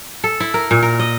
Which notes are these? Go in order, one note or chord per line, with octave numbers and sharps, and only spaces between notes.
A4
E4
A#4
A#2
A#4
D#5